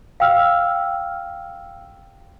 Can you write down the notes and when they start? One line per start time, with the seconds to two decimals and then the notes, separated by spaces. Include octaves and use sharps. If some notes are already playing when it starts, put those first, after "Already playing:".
0.20 F5 G5 E6 F6